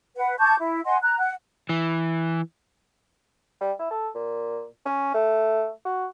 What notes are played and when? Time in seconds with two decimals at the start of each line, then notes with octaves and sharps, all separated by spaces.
0.16 B4 F#5
0.39 A5 C#6 D6 G6
0.58 E4
0.85 D#5 F#5 G#5 C6
1.04 A#5 F#6
1.18 F#5 F#6
1.69 E3
3.61 G3
3.79 E4
3.91 A4
4.15 A#2
4.85 C#4
5.14 A3
5.85 F#4